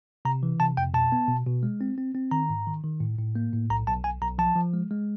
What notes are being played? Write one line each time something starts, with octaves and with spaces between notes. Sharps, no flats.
C3 A#5
E3
C3 A5
F2 G5
B2 A5
B3
B2
B2
G#3
C4
C4
C4
D#3 A#5
G#2
D#3
D#3
A2
A2
A#3
A2
B1 A#5
B1 A5
B1 G#5
B1 A#5
F3 A5
F3
G#3
G#3